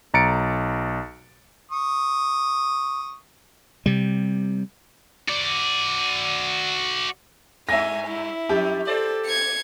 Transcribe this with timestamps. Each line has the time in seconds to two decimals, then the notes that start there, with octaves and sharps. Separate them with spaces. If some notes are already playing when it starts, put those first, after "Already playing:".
0.14 B1 A#5 A6 C#7 D7
1.71 C#6 D#6
3.86 C3 G3
5.28 F#4 D5
7.69 G2 E5 G#5 A#6
8.08 E4
8.49 F2 G4
8.87 A4 C5 D5
9.26 G#6 C#7